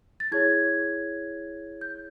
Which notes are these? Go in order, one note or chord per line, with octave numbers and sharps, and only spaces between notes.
A6
E4 G#4 C#5 G#6
G6